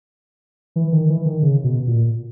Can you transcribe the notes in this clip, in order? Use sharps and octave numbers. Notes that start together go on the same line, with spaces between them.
E3
D#3
E3
D#3
C#3
B2
A#2